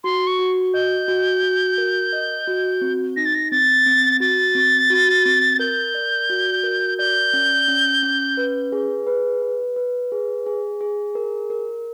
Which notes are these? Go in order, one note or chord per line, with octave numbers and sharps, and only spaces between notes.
F#4 C6
C#6
F#4
D#5 G6
F#4
F#4
A#4
D#5
F#4
C4
D#4 A#6
A6
A#6
C4 A6
C4
F#4 A6
C4
F#4
C4
A#4 G6
D5
F#4
A#4
D5 G6
C#4
C#4
C#4
B4
G#4
B4
B4
B4
G#4
G#4
G#4
A#4
A#4